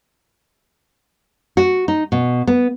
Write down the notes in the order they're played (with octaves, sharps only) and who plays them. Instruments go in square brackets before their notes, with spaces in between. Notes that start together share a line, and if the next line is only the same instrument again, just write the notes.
[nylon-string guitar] F#4
D#4
B2
B3